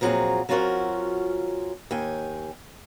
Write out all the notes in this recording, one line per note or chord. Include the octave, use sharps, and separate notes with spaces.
A#2 F3 F#3 C4 G#4 A#5
F#3 C4 C#4 F4 F#4 A#4
D#2 G5 G#5